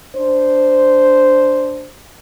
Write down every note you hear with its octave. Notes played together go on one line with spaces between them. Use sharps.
D4 C5